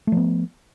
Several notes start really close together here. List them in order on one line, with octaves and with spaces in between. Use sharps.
A3 F3 B3